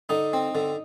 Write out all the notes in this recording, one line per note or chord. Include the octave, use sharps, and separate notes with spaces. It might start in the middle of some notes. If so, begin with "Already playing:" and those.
D3 D#4
C4
D3